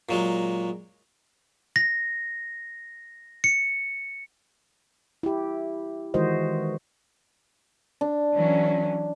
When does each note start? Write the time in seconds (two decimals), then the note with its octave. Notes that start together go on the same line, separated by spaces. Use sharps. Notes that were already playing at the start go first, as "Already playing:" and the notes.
0.09 A#2 F#3 G#3
1.76 A#6
3.44 C#7
5.23 E4 G4
6.14 D#3 E3 G#3 F#4 C5 D#5
8.01 D4
8.34 E3 F#3 C#4